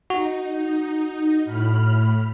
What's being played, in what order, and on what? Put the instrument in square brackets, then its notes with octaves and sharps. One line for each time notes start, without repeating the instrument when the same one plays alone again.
[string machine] D#4 [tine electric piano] F#4
[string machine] A2 B5 F6